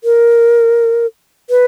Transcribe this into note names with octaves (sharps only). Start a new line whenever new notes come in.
A#4
B4